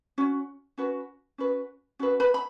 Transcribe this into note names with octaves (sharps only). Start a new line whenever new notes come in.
C#4 F#4
C#4 F#4 B4
C#4 F#4 B4
C#4 F#4 B4
B4 B5
B5